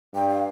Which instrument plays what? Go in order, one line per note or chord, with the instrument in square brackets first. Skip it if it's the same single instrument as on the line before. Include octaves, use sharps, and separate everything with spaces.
[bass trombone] G2 [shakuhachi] G5
[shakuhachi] F5